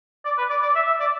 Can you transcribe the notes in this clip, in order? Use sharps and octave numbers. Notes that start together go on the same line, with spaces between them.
D5
B4
D5
D5
E5
E5
D5